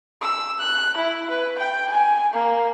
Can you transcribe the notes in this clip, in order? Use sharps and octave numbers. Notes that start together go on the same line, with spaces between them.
E6
F#6
E4
B4
G5
G#5
A#3